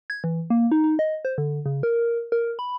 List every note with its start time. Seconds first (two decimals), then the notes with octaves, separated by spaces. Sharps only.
0.10 G#6
0.24 E3
0.50 A#3
0.72 D#4
0.84 D#4
0.99 D#5
1.25 C5
1.38 D3
1.66 C#3
1.83 A#4
2.32 A#4
2.59 B5